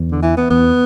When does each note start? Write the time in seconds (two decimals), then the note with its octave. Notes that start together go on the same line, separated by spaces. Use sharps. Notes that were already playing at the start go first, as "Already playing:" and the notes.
Already playing: E2
0.11 D3
0.22 E3
0.37 B3
0.50 E2 B3